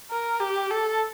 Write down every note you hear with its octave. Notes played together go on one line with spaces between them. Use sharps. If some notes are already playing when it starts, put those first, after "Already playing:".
A#4
G4
A4